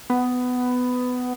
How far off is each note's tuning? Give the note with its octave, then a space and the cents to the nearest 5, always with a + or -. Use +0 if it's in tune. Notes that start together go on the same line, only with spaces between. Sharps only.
B3 +15